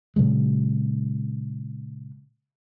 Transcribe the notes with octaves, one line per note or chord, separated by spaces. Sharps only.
A#2 C#3 F#3 G#3